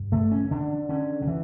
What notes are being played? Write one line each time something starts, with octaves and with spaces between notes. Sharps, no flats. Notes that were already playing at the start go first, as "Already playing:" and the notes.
Already playing: G2
D3 A3
C#4
D3 D4
D3 C#4
D3
E3